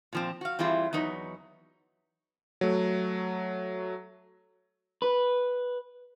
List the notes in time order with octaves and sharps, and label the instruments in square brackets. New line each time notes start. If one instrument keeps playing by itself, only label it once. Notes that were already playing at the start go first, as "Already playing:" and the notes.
[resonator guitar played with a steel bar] A#2 F3 C4
F#4 F5
E3 G3 C4 E4 F4 G#4
E2 F#3 D#4 B4 C#5
[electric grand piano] F#3 A3
[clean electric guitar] B4